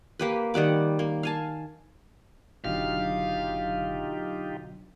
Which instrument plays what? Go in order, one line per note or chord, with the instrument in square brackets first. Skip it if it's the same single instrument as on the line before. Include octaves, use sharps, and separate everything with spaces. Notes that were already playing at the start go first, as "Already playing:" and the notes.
[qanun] A#3 G4 B4
D#3 G3 F#5 D6
A#3
F5 G#5 A5
[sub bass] F#1 [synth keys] B2 D3 F#3 [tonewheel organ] D#4 F4 G4 [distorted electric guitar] F5